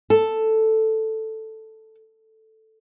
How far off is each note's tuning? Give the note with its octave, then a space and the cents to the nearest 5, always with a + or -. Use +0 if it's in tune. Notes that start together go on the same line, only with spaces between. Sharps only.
A4 +0